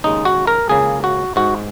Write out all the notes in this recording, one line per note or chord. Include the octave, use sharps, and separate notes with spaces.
D#2 C#3 G#3 D#4
F#4
A#4
C#2 C#3 A#3 G#4
F#4
G#2 G#3 F#4